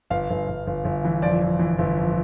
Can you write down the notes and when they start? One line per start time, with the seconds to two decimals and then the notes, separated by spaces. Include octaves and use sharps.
0.10 G1 F5
0.30 G1
0.48 G1
0.67 G1
0.85 G1
1.04 E3
1.22 F2 D5
1.42 F2
1.59 E3
1.78 G1
1.98 F2